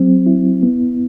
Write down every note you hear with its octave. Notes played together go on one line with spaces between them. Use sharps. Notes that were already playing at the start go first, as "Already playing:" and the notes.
Already playing: F#3 C4
E4
B3